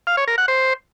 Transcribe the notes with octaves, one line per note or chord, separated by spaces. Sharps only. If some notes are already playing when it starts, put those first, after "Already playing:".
F5
C#5
A#4
F#5
C5